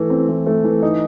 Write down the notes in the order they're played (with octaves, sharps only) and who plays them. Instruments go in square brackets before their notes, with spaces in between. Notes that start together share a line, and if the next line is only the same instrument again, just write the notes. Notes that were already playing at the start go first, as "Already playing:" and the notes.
Already playing: [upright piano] E3 A3
C4
E3
A3
E3
D#4